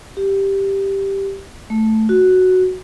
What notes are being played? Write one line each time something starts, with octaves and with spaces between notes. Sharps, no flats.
G4
A3
F#4